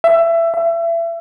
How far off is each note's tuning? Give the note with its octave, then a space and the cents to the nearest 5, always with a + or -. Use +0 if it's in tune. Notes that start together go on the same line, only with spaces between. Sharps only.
E5 +20
E5 +30